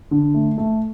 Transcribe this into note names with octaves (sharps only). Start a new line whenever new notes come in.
D3
A3
A3